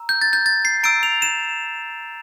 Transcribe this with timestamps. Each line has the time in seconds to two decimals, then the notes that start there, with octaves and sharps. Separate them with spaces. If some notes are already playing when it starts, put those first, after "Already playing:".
Already playing: A#5 E6
0.09 G6
0.22 A6
0.33 G6
0.46 A6
0.65 C7
0.83 A#5 E6 G6 D7
1.03 F7
1.22 E7